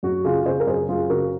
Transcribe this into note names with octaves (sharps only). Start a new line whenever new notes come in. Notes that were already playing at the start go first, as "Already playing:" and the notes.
F#2 F#4
C#3 F4 G#4
C#3 G#4 C5
A#4
F#2 G#4 C5
F#2 F4 G#4
C#3 F#4 A#4